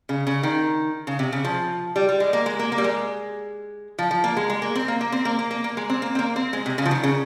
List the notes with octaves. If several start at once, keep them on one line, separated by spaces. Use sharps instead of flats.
C#3
C#3
D#3
C#3
C3
C#3
F3
G3
G3
G#3
A#3
G#3
A#3
A#3
G3
G#3
F3
F3
A#3
G#3
G#3
A#3
C4
A#3
A#3
C4
A#3
A#3
A#3
A#3
G#3
C4
A#3
C4
A#3
C4
G#3
C3
C#3
F3
D#3
C#3